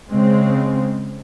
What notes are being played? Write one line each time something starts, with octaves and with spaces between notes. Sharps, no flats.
C#3 G#3 C4